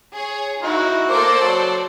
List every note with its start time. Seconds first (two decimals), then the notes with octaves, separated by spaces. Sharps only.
0.12 G#4 C#5
0.64 D#4 E4 F#4
1.10 A#3 A4 A#4 C5 D5 D6
1.40 F#3 A5